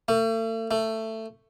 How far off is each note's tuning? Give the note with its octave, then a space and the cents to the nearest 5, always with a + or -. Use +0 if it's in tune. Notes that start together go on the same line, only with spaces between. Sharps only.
A3 +40
A3 +15